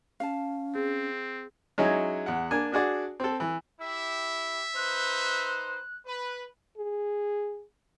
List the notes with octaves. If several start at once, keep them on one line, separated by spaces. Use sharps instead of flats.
C#4 F5 A5
C4 G#4
F#3 G#3 C#4 D#4 E4 G#4
E2 F#5
A#3 D4 G#5
D4 F#4 G#4 D5
C4 A4
E3
E4 G4 E5
D#4 B4 C5 F#6
B4
G#4